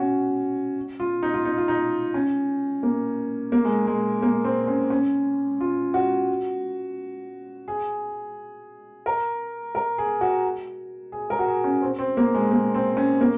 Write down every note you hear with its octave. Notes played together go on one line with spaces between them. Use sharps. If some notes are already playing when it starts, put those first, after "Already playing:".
Already playing: C#4 F#4
F4
D#4
F4
D#4
F4
D#4
C#4
A#3
A#3
G#3
G#3
A#3
C4
C#4
C#4
F4
F#4
G#4
A#4
A#4
G#4
F#4
G#4
A#4
F#4
G#4
C#4
C4
C4
A#3
G#3
A#3
C4
C#4
A#3